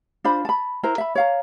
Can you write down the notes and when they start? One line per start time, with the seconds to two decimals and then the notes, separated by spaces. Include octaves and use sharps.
0.24 D4 F4 C5 B5
0.45 A5 B5
0.83 E4 A#4 C5 A#5
0.98 E5 B5
1.15 C#5 F5 A#5